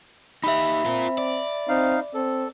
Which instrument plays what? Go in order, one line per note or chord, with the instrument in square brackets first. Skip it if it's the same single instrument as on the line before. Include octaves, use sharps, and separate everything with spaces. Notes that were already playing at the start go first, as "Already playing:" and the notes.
[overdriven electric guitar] D#4 G4 [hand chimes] E5 B5
[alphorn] C4 [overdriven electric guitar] F4 A#4
[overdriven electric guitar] D5
[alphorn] C4 [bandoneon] D#4 F5
[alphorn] C4 [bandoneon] A4